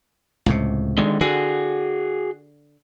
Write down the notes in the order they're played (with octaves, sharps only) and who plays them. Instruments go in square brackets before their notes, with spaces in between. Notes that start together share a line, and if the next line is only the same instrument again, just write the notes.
[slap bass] C#2 A2 C3
[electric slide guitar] D3 D#3 G#3
[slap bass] D3 [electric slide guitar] F#4 G#4